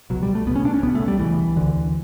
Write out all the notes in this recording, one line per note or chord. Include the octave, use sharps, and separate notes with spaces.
C#2 B2 F#3
G3
A3
C#2 B2 B3
C#4
D4
C#4
C#2 B2 B3
A3
G3
C#2 B2 E3
D2 D3